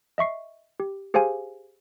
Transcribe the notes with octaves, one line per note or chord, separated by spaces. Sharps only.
D#5 E5 C#6 C7
G4
G4 G#4 C5 F5 G#5